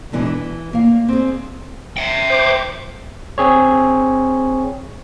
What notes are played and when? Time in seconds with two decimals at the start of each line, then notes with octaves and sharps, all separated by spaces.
0.12 F#2 B2 D3 E3 G#3 C#4
0.25 E3
0.71 D2 A#3 F5
1.08 C4 G#4
1.97 E5 G5
2.30 C5 D6
3.38 C4 G#4 C#5